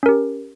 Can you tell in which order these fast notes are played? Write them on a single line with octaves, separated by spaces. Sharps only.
C#4 A#4 G4